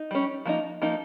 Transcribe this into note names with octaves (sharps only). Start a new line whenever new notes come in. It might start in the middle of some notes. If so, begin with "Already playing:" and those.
Already playing: D#4
G3 C#4
F3 A#3 D#4
F3 A#3 D#4